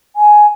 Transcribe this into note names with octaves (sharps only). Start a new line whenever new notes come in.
G#5